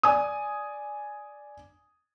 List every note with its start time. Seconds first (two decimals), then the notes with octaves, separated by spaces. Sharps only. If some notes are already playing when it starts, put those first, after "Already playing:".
0.03 D5 G#5 D#6